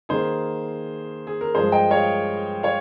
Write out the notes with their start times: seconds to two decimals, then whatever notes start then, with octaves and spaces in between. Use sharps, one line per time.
0.09 D#3 A#3 D#4 G#4 C5
1.27 G#4
1.41 A#4
1.55 G2 F3 G#3 G#4 C5
1.72 D#5 G5
1.91 C#5 F5
2.63 C#5 F5